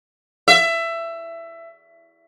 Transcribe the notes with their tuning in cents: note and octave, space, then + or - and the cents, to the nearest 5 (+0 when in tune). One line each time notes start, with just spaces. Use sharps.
E5 +20